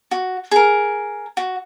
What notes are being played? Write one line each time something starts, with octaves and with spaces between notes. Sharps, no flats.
F#4
G#4 A#4
F#4